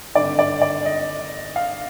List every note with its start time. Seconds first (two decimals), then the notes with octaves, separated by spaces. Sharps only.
0.14 G#1 G2 D3 D5
0.39 D5
0.62 D5
0.86 D#5
1.56 F5